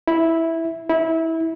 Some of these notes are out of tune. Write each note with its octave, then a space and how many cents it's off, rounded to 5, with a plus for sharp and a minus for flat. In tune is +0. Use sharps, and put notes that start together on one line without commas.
E4 -5
E4 -20